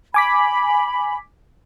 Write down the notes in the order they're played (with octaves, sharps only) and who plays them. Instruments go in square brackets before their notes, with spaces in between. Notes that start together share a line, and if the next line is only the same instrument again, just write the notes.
[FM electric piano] G#5 D6 B6 [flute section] B5